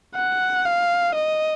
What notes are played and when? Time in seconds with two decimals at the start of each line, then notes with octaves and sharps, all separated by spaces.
0.15 F#5
0.65 F5
1.15 D#5